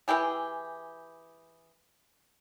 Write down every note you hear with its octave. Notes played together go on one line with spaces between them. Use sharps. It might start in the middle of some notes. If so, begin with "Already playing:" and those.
E3 E4 G4 G#4